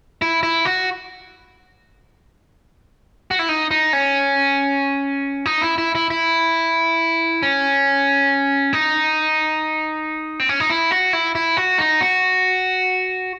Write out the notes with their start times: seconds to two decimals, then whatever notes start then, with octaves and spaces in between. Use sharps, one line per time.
0.22 E4
0.43 E4
0.65 F#4
3.31 F#4
3.39 E4
3.49 D#4
3.71 D#4
3.93 C#4
5.46 D#4
5.62 E4
5.78 E4
5.95 E4
6.10 E4
7.43 C#4
8.73 D#4
10.39 C4
10.49 C#4
10.60 D#4
10.70 E4
10.91 F#4
11.13 E4
11.35 E4
11.57 F#4
11.78 D#4
12.01 F#4